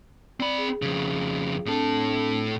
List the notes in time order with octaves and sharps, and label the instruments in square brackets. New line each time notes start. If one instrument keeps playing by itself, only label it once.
[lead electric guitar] C4 B5 [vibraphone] D5
[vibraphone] G#4
[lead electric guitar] F2 C#3
[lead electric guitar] A2 A4 [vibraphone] C4 D4 A5